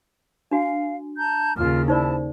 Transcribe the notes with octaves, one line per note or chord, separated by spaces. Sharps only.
D4 F#4 F5 G#5
A5 A#5 G6
D#2 C#3 F4 F6
D#4 E4 C5 D5 A5